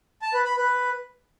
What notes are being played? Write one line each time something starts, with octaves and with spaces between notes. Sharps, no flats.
A5
B4
B5
B4